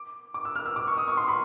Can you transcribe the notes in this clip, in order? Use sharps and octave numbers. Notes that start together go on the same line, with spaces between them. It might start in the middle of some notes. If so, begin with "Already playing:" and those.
Already playing: D6
D6
E6
F6
E6
D6
C#6
D#6
C#6
C6
B5